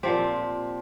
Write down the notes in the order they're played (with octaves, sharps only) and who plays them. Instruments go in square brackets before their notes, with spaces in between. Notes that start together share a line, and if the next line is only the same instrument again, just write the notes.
[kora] A#2 F3 C4 G4